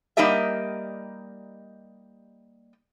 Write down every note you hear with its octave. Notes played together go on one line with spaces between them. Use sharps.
G3 A#3 D#4 G4 D#5 E5